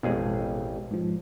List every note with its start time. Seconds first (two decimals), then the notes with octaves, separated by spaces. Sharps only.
0.03 A1 F2 B2 G#3 G#4
0.91 G#2 F3